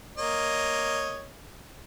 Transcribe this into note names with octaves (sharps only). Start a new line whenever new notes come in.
A#3 C#5 D#5